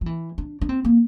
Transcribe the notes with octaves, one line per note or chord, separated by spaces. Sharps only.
F3
E3
D4
D4
C4
A#3